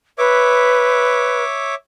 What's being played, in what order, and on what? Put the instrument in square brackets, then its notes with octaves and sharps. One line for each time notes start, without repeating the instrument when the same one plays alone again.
[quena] B4 [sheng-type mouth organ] C#5 E5 D6